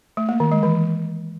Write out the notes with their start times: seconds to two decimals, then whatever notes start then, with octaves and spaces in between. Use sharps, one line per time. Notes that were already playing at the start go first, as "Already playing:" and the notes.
0.17 A3
0.29 A#3
0.40 D#3
0.52 G#3
0.63 E3